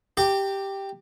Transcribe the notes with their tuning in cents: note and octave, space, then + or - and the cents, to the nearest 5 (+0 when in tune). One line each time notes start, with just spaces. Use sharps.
G4 +0 A#5 -35